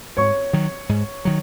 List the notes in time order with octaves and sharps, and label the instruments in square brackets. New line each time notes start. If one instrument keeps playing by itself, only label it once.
[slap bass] G#2 [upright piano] C#5 C#6
[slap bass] D#3 F#3
G#2
D#3 F#3